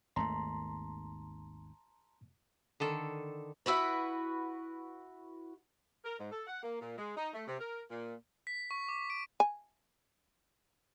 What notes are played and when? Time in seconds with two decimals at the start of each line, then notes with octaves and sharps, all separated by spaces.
0.16 G#1 D#2 A3 A5 A#5 C6
2.80 D3 D#3 A4
3.66 E4 F#4 B4
6.04 A#4
6.19 G#2
6.31 A4
6.47 F#5
6.62 A#3
6.80 A#2
6.97 G#3
7.16 D#4
7.33 A3
7.47 C3
7.59 A#4
7.89 A#2
8.47 B6
8.71 C#6
8.89 D6
9.10 D7
9.40 G#5